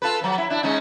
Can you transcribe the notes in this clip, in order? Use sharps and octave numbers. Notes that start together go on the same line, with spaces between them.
F4 A4 B4
F3 F#3
E4
D4 E4
G#3 C#4 D#4